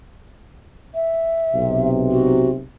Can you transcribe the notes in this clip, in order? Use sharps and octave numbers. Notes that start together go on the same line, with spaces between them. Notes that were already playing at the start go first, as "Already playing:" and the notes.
E5
B1 C3
F#4